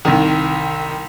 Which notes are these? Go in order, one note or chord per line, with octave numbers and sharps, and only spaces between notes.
C2 D#3